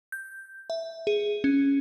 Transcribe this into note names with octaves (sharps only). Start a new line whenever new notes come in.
G6
E5
G#4
C#4